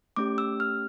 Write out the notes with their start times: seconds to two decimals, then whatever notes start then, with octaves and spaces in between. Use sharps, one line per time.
0.16 A3 C#4 G4 D6
0.38 E6
0.60 F6